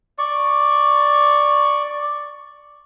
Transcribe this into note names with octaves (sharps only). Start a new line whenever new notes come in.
D5 C#6